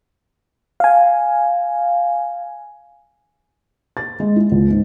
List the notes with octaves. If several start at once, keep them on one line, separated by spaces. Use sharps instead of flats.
F5 G#5
A6
G#3
E4
C#2
G#2